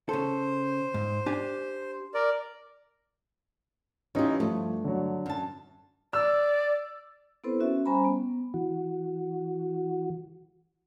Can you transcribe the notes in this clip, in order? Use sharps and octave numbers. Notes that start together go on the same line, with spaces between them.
C#3 A4 C5
G#2
D4 G4 G#5
A#4 D5
E3 C#4 D#4 F4 G4
G2 F3 A3
D3 F#3
F#2 A5
D5 E6
B3 C4 E4 A4 B4 C5
C#4 F#4 E5
G3 C#4 C5 G#5 A#5 B5
B3
E3 F#4